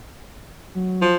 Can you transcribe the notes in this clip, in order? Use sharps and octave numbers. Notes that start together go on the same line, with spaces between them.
F#3
F3